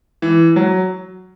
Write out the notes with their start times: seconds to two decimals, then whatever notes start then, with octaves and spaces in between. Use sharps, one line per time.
0.22 E3
0.56 F#3